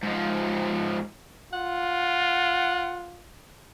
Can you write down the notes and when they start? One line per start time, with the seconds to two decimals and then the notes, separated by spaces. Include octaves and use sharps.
0.03 G#2 F3
1.53 F4 F#5